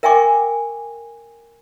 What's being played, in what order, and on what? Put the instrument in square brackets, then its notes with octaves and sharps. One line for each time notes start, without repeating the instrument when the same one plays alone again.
[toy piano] A#4 E5 G5 G#5 C#6 D6